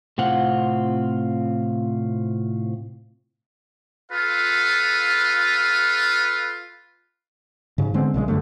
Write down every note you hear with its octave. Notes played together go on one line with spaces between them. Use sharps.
A2 C3 C4 F4 F#5
F4 A4 B4 F5
G#2 C#3
D3 G#3 B3 C4
A#1 C#3 E3 G#3
F#2 D3 A3